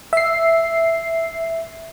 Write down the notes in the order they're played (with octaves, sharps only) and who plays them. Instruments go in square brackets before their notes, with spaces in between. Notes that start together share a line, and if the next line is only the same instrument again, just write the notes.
[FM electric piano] E5 C7